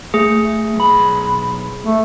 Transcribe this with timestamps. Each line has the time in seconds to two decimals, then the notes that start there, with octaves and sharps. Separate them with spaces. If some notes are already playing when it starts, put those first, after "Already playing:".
0.14 A3 G#4
0.76 B1 B5
1.85 A3